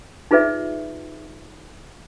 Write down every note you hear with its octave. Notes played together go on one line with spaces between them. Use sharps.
D#4 F4 G#4 B4 D5 E5